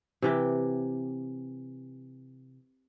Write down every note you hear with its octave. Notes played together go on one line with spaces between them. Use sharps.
C3 E3 G4